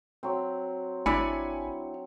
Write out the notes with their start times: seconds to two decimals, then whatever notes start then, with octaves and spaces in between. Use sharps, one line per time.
0.23 F#3 C4
1.06 G#1 D4 E4 D5 G#5 B5 C#7